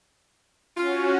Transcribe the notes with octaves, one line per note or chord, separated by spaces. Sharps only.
C#4 F4 F#4